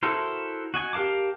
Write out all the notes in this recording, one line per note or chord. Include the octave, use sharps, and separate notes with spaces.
E4 F#4 A4 A#4 C5
F#4 D#5 G#5
G4 A#4 F5 A5 D6